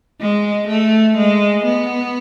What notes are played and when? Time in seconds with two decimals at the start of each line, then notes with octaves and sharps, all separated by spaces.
0.20 G#3
0.68 A3
1.17 G#3
1.65 B3